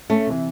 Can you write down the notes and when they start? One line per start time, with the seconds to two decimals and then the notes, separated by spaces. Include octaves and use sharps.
0.10 A3 C#4
0.27 C3 E3